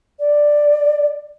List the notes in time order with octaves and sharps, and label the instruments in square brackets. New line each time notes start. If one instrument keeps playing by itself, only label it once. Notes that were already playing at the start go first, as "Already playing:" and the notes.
[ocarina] D5